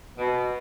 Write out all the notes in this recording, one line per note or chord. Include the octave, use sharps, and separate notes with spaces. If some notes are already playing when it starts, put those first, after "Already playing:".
B2